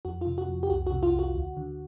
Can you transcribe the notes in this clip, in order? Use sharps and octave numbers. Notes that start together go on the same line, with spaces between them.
F2 F#4
F4
C3
F#4
F2
G4
C2 F#4
F#4
C3
F4
C2
F#4
D2
D3